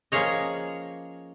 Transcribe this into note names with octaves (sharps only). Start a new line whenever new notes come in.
F3 A#3 C#4 G#4 C#5 D#5